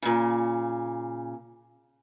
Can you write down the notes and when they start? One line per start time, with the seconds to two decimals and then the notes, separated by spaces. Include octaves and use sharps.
0.02 A#2 C#3